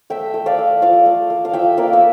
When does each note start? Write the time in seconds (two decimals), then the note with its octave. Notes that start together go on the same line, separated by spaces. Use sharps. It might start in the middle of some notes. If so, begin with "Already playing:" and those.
0.10 A3 E5 G5
0.34 A3
0.46 D5 F5
0.58 A3
0.82 F4 D5 F5
1.06 A3
1.30 A3
1.45 F5
1.53 F4 E5 G5
1.77 A#3 D5 F5
1.93 E5